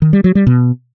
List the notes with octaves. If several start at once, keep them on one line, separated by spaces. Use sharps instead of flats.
D#3
G3
F#3
G3
B2